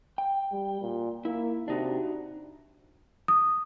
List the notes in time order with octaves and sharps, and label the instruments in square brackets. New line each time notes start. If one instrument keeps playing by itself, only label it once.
[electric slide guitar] G5
[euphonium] G3
A#2
[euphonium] A#3 [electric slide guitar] E4
[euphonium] C3 [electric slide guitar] D4 D#4 F#4
[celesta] D#6